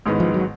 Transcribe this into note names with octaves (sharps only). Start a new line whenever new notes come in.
A1 G#2 D#3 G#3 B3
F3
F#3